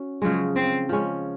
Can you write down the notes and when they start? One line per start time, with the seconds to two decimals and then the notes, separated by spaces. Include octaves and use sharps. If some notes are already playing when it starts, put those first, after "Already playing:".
Already playing: C#4 F#4
0.22 C#3 F3 F#3 G#3
0.56 C4
0.89 F3 G#3 C#4